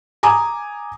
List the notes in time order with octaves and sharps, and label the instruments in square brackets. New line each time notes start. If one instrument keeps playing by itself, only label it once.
[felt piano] G#5 A#5 D6 D#6